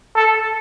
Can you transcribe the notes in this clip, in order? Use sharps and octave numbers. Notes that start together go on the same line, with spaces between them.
A4